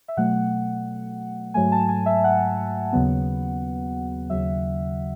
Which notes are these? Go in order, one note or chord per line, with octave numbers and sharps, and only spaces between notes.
E5
B2 F#3 A3 F#5
G#2 F#3 A3 G#5
A5
G#5
E5
F#5
D#2 C#3 F#3 B3
D#2 C#3 F#3 E5